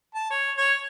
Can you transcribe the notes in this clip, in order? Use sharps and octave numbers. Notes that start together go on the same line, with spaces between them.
A5
C#5
C#5